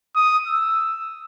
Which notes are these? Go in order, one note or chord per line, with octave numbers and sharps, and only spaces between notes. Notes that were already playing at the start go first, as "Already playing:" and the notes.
D#6
E6